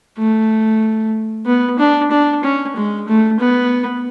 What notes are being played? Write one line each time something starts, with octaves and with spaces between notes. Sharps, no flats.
A3
B3
D4
D4
C#4
G#3
A3
B3